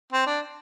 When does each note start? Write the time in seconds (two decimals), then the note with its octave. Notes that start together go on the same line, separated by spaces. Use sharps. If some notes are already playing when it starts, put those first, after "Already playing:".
0.13 C4
0.26 D4